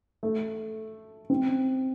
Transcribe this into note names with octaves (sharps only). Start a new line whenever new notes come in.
A3
C4